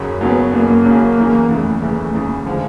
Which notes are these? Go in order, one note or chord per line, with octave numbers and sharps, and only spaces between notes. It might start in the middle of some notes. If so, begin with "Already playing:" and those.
Already playing: F#2 C#3 F#3
F#2 C#3 F#3 B3
F#2 C#3 F#3 A#3
F#2 C#3 F#3
E2 C#3 E3
E2 C#3 E3 A3
E2 C#3 E3
E2 C#3 E3
D3 F3 G#3